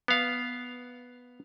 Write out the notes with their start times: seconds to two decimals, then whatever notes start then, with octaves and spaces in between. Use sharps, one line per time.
0.08 B3 F5